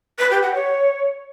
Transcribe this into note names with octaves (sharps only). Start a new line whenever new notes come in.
B4
G4
F#5
C#5